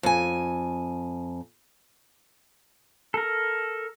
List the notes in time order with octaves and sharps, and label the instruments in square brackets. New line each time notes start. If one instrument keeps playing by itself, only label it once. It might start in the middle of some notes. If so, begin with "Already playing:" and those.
[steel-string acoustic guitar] F2 G#5
[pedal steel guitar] A4 A#4